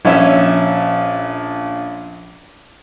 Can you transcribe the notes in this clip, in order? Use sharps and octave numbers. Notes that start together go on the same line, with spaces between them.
A#1 C#4 E5